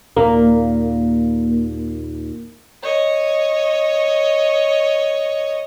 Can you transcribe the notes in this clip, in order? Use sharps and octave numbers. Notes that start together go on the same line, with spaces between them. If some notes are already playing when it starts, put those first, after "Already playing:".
D#2 A#2 A#3
C#5 D#5